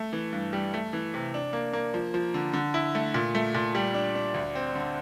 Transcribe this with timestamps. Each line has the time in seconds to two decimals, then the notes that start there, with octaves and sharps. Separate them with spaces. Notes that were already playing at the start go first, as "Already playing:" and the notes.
Already playing: A3
0.13 E3
0.33 G2
0.53 G3
0.74 A3
0.93 E3
1.14 C3
1.34 D4
1.53 A#3
1.73 A#3
1.94 F3
2.14 F3
2.34 D3
2.53 D3
2.74 E4
2.95 A3
3.14 A#2
3.35 A3
3.55 A#2
3.75 G3
3.94 D4
4.15 D4
4.34 D2
4.55 C4
4.75 D3